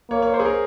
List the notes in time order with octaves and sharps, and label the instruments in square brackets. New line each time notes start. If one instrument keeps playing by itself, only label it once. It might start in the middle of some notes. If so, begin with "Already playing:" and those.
[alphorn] A#3 [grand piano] C#5
[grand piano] C#5
C5
G#4
A#4